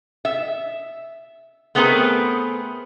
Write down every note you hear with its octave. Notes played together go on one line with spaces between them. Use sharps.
E5
A3 B3 C4 G#4 A#4 B4